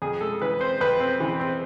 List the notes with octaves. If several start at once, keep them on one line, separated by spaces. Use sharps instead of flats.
F2 G#4
G#3 A4
E3 B4
C4 C5
F2 B4
C4
E3
C4